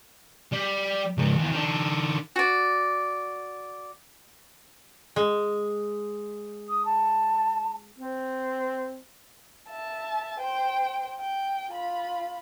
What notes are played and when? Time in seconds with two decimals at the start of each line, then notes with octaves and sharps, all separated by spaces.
0.52 G3
1.18 C#2 G#2
1.37 D#2 E3
1.52 D#3 D4
2.36 F#4 D5
5.16 G#3
6.69 D#6
6.85 A5
7.98 C4
9.68 E5 A5
10.40 C5 G5
11.20 G5
11.70 F4 B5